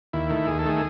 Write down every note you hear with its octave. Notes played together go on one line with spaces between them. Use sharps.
D#2 E4
D#3 A3
D#2 G#4
A4
D#3 A3 G#4